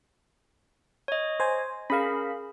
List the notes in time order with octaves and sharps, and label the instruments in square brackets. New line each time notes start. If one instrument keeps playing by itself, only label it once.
[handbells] C#5 D#5
[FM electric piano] C5 G#5
[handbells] C#4 G#4 A#4 [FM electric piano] F5 B5